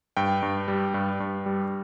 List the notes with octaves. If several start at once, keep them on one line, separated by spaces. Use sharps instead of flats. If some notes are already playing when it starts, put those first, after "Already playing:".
G2 G5
G2
G3
G2
G2
G3